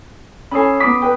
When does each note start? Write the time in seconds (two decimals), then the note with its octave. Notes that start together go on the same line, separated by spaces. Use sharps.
0.51 C#4 A4 G#5 B5 D#6 C7
0.80 B3 B5 D6 D#6 B6
1.02 B4 G5